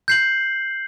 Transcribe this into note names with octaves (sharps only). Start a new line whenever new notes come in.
G6 C7 F#7